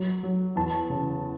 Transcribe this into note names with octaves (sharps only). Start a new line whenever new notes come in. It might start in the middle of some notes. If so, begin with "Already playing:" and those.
Already playing: F#3
F#3
E2 A5
C#3